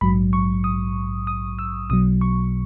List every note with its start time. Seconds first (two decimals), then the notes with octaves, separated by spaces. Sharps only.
0.01 A#1 G#2 F#3 B5
0.33 C#6
0.64 D#6
1.27 D#6
1.59 E6
1.90 B1 B2 F#3 D#6
2.21 C#6